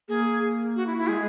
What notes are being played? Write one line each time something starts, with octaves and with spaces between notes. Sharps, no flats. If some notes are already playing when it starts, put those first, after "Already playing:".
A#3 G#4
F#4
E4
E4
G#3 G#4